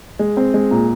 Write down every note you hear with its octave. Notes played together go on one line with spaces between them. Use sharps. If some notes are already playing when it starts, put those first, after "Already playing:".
G#3
C4
G#3
A#2